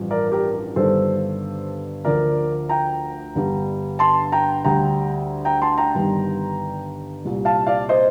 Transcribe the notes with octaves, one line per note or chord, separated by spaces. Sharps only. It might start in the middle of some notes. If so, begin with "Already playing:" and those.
Already playing: A1 G2 F3
A#4 D5
G4 A#4
G1 G2 D#3 A4 C5
D2 D3 F3 A#4 D5
G5 A#5
G1 G2 D3 G3
A5 C6
G5 A#5
D2 D3 G3 G5 A#5
G5 A#5
A5 C6
G5 A#5
G1 G2 D#3 G3
C2 A#2 G3
F5 A5
D5 F5
C5 D#5